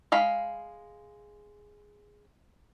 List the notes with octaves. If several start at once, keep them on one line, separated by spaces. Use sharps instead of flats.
G#3 F5 B5